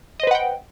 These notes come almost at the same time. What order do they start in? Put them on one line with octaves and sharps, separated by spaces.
D#5 C5 B4 F#5 G5